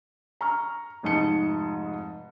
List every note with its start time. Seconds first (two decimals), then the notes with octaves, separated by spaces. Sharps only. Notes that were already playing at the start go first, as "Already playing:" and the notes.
0.41 A#5 C#6 F6
1.03 F1 G#2 D#4 A5 C#7